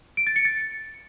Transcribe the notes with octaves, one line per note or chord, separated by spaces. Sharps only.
D7
A6
C#7
A6